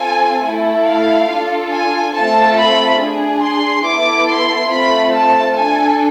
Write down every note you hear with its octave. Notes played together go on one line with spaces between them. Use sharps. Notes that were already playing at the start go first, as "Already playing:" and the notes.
Already playing: C4 F4 A4 G#5
A3 E4 A4
F5
D4 F4 A4
G#5
A3 C4 F4 A4 A5
B5
D4 G#4
C6
B3 E4 A4 D6
C6
A3 C4 F4 A4 B5
A5
D4 A4 G#5